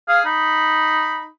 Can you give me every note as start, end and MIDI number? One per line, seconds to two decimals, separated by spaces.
0.08 0.25 68
0.08 0.20 77
0.26 1.28 63
0.26 1.27 83